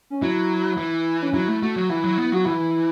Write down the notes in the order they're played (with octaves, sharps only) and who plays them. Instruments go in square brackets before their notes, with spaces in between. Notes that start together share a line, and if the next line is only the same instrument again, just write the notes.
[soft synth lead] C#4
[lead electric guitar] F#3 [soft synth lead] E4
[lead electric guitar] E3
[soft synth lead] C#4
[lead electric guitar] F#3 [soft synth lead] E4
[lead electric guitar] A3
[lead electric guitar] A3 [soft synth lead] F#4
[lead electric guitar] F#3
[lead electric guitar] E3 [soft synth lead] E4
[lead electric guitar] F#3
B3
[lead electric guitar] F#3 [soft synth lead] F#4
[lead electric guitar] E3 [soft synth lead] E4